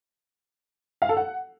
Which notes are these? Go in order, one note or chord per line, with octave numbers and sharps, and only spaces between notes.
F5
A4
F#5